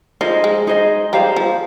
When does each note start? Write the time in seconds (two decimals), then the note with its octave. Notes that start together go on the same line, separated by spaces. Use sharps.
0.21 F3 D#4 G#4 C5 D#5
0.44 G#3
0.67 D#4 G#4 C5 D#5
1.13 G3 G#4 C5 F5 A#5
1.36 F3